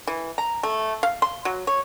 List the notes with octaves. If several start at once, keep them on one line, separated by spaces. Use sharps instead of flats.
E3
A#5
A3
F5
C6
F#3
C#5